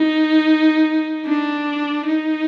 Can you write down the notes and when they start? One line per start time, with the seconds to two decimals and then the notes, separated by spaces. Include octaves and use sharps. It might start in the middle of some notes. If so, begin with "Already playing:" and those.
Already playing: D#4
1.26 D4
2.07 D#4